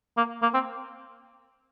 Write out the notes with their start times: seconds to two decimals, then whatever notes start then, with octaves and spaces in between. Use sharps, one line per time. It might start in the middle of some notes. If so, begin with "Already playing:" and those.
0.17 A#3
0.42 A#3
0.54 C4